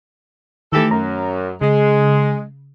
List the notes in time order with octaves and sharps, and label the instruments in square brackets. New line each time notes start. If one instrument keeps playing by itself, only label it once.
[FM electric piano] D#3 A3 [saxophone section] E3 G4 A4
[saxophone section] F#2 [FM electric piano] A#5
[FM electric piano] C#3 [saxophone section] G#3